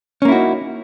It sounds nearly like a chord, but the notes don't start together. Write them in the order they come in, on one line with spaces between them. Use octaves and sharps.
C#4 A#3 E4 F#4 D#4